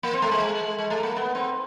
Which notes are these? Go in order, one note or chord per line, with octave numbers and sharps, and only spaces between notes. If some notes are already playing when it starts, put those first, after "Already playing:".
A#3
C4
A3
G#3
G#3
A3
A#3
B3
C4